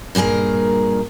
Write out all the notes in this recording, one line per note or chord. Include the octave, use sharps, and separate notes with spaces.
G2 A#2 C#4 G#4 A#4